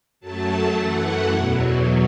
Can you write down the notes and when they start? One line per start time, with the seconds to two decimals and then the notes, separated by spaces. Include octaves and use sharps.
0.20 F#2 F#3 A3 A5
0.75 F#2 E3 A3 F#5
1.31 E2 B2 F#3